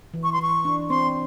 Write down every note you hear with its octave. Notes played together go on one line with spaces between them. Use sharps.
E3
C#6
C6
E3 C#6
D4
C4 C6